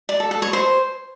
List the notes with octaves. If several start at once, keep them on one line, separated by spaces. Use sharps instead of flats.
D5
A4
A4
C#5
C5